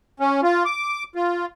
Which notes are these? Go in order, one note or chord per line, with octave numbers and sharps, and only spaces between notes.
C#4
F4
D6
F4